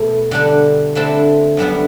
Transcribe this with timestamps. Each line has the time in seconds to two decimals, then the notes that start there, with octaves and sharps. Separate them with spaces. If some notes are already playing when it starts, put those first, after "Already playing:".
Already playing: B2 A3 E4
0.31 D3 G3 D4
0.95 D3 A3 C4 E4 A4
1.57 F#2 D3 G3 B3 E4